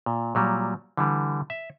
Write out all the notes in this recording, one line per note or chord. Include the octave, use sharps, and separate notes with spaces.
A#2
A#2 F#3 G3
D3 E3 G3
E5